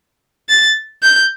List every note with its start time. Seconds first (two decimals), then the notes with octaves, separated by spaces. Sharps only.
0.49 A6
1.03 G6